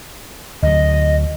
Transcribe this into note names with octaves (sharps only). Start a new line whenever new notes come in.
D2 F#3 D#5